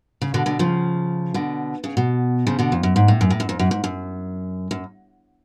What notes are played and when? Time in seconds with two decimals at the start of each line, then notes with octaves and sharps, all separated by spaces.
0.21 C#3
0.34 B2 D3
0.46 B2 D3
0.59 C#3 F3
1.34 B2 D3
1.84 C#3
1.97 B2
2.47 C#3 F3
2.59 B2 D3
2.72 F2
2.83 F#2
2.96 G#2
3.08 A2
3.21 F#2
3.30 A2
3.40 F#2
3.49 F2
3.59 F#2
3.71 G#2
3.84 F#2
4.71 F#2